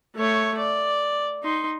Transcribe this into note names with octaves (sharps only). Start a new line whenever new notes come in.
A3 C#5
D5
D#4 C6